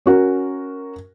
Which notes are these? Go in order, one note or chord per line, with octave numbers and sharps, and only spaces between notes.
C#4 F#4 A#4